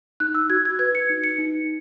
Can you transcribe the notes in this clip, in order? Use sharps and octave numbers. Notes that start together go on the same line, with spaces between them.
D#4 F#6
E6
F#4 G#6
G#6
B4 G#6
C#7
D#4
C#7
D#4